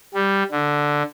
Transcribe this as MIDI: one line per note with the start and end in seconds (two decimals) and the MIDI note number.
0.14 0.43 55
0.51 1.03 50